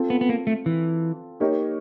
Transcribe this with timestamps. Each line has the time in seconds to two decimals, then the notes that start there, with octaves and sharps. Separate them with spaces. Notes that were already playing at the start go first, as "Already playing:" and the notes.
Already playing: C4 F4 A4
0.10 B3
0.21 B3
0.29 A#3
0.47 A3
0.66 E3
1.40 A#3 D#4 G4 A#4 C#5